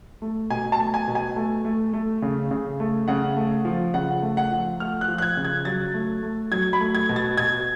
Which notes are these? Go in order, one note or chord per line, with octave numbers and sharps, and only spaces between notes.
A3
B2 G#5
A5
A3
G#5
B2
G#5
A3
A3
A3
C#3
C#3
A3
C#3 F#5
A3
F3
C#3 F#5
A3
F#5
F3
A3 F6
F#6
F3
F#6
G#6
C#3
G#6
F#3 A6
A3
A3
F#3 G#6
B5
A3
G#6
B2
A6
B2 G#6